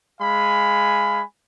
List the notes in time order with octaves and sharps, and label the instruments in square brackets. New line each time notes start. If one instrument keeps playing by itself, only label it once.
[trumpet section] G#3 F5 G#5 B5